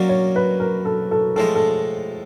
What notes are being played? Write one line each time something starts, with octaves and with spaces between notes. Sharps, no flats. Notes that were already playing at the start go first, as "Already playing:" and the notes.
Already playing: F#3 A#3 C#4 D5
C#5
B4
A#4
A4
A4
A2 F3 G#3 A4
A4